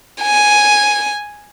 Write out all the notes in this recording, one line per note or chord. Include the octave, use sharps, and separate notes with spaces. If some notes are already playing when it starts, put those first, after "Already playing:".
G#5